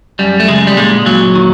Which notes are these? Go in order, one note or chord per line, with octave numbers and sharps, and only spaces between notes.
F#2 G3
A3
C#3 G#3
G3
A#2 G#3
A#2 F#3
D#3